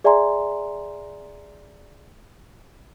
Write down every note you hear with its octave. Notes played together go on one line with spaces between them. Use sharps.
G#4 D5 E5 G#5 A#5 C6